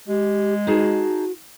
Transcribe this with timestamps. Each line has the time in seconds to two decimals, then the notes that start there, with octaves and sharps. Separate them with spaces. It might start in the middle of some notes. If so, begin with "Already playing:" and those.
0.08 G#3 G4
0.67 D#4 F#4 G#4 A5